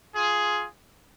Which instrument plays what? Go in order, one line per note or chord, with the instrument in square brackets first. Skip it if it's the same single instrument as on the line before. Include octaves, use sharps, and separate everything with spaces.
[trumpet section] F4 G#4